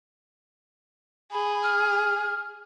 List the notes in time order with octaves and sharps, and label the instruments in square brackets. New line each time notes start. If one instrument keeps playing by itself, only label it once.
[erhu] G#4 [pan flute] B5
[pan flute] F6